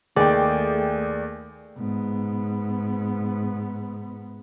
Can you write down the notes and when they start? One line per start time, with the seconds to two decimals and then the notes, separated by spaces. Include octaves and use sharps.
0.16 D#2 A3 G#4 D5 G5
1.77 G#2 B3